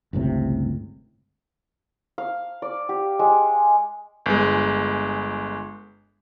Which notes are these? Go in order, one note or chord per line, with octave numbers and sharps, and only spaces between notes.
G1 C#2 A2 C3
F5
D5
G4
G#3
G1 G#3